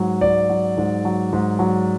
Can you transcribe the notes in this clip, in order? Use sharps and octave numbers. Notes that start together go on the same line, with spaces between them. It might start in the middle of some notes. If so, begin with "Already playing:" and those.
Already playing: G#2 F#3
G#2 D5
F#3
G#2
F#3
G#2
F#3